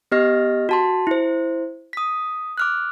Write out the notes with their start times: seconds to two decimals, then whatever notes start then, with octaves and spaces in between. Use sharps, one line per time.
0.11 B3 G4 D#5 F6 A#6
0.69 F#4 A5 C6
1.07 E4 C5
1.93 D#6 B6
2.58 D6 F6 F#6